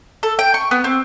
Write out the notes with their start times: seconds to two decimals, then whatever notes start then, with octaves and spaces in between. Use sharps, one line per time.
0.23 A4
0.39 G5
0.54 C#6
0.71 B3
0.84 C4